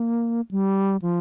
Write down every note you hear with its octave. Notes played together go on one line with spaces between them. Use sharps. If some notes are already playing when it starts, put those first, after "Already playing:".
Already playing: A#3
G3
F3